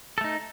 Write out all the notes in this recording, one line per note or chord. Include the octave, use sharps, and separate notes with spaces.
A3 D#4 A4